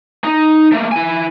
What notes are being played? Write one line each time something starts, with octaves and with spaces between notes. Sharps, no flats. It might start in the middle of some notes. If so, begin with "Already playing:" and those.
D#4
A3 A#3
E4 G#5